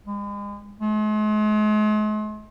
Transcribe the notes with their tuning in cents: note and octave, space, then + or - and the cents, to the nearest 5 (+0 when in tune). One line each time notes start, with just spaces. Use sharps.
G#3 -40
G#3 +45